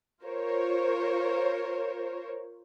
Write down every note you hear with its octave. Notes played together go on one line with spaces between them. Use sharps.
F4 A#4 C5 C#5